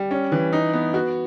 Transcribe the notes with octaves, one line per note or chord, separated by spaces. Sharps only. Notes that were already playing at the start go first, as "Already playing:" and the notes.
Already playing: G3
C#4
E3
D#4
B3
F#4